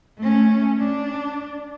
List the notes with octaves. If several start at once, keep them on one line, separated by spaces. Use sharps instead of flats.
A3 C#4
D4